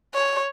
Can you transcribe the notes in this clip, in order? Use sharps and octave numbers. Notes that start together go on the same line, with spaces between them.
C#5